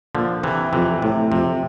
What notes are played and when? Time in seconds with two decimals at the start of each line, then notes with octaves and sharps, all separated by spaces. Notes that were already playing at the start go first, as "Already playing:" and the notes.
0.15 A#2 D3 F3
0.43 C3 E3
0.73 F2 C3 E3
1.02 A2 C3
1.31 F2 C3